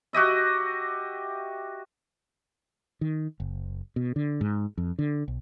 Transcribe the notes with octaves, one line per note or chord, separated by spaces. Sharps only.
F#4 G4 D#5 E5
D#3
F#1
B2
D3
G#2
F2
D3
B1